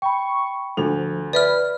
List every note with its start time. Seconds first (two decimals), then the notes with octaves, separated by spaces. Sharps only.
0.02 G5 B5 C#6
0.77 D2 F3 A4 F7
1.33 B4 D5 E5 F6